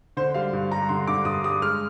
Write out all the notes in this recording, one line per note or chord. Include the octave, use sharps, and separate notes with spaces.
D3 C5
G3 F5
G2
G3 A#5
D3 C6
D3 D6
G2 D#6
G3 D#6
G#3 F6